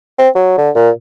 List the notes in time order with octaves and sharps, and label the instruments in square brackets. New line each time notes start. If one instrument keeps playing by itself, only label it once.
[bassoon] C4
F#3
D3
A#2